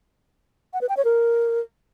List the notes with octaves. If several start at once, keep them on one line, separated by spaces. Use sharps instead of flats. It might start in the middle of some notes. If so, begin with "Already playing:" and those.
F#5
B4
G5
C#5
A#4